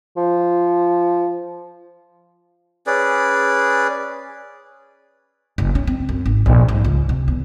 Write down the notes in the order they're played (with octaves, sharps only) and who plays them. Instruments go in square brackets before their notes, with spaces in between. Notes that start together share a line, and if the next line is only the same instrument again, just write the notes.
[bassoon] F3
[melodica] C#4 G#4 B4 D5
[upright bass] F#1
C#4
C4
F#2
G#1
A#1
G#2
C#2
C3
E2